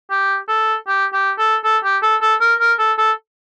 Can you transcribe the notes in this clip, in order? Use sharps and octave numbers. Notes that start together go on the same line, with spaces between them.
G4
A4
G4
G4
A4
A4
G4
A4
A4
A#4
A#4
A4
A4